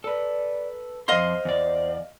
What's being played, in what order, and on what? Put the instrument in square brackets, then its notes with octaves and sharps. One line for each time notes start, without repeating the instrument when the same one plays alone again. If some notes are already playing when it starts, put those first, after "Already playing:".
[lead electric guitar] A4 B4 [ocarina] D5
[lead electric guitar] F2 C6 [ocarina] C5 [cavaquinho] D#5 F5 D#6
[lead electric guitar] E2 D5